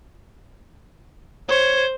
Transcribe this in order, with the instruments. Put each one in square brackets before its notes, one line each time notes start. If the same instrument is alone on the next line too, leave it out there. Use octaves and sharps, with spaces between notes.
[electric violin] C5 [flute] C#5